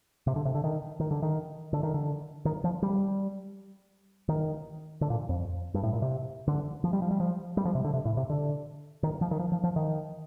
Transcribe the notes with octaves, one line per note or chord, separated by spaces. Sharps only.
C3
D3
C3
D3
D#3
D#3
D3
D#3
D3
D#3
D3
D#3
F3
G3
D#3
D3
A#2
F2
G2
A2
A#2
C3
D3
F3
G3
F3
G3
F3
G3
F3
C3
D3
C3
A2
C3
D3
D#3
F3
D#3
F3
F3
F3
D#3